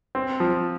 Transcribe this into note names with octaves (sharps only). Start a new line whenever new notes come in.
C4
F3